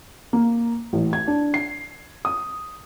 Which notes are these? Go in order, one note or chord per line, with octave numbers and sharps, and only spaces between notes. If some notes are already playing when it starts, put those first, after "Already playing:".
A#3
A1
G#6
D4
C7
D#6